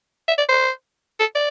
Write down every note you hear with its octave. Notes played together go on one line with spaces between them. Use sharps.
E5
D5
C5
A4
D5